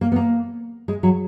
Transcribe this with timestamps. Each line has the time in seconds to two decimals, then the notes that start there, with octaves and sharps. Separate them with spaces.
0.01 A#3
0.12 B3
0.16 A#3
0.88 G#3
1.03 F#3